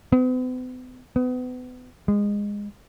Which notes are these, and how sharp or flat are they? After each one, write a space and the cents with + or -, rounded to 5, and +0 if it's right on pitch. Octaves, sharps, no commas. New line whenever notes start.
B3 +45
B3 +30
G#3 -20